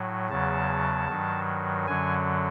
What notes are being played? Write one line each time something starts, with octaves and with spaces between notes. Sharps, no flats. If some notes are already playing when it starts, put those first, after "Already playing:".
Already playing: A2 F#3
E2 C#3 F#3 A5
G2 D#3 F#3
F#2 D3 F#3 G#5